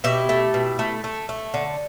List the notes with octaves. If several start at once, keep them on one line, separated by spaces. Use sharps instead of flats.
B2 E4 G4
A3
B2
A3
A3
A3
D3